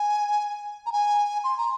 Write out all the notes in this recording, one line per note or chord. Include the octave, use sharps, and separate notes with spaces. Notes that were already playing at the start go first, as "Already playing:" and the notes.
Already playing: G#5
A#5
G#5
C6
A#5